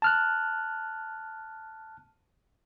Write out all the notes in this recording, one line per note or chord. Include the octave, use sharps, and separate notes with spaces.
A5 F6 F#6